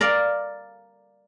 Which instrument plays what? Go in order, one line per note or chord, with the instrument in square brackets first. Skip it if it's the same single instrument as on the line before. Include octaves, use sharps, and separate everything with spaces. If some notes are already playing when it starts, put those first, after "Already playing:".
[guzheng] A#4 D5 F5